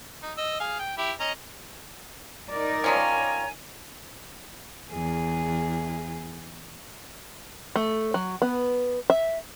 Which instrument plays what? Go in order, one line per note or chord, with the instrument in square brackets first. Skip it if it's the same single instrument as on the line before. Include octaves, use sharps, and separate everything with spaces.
[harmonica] D#4
D#5 E6
G#4 F5
G5
E4 G4
C#4 D#5 A#5
[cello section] D#4 A#4 D5
[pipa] D#3 F3 C#4 [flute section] C#5 G#5 A#5
[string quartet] E2 G#4
[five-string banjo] A3
F#3
B3
E5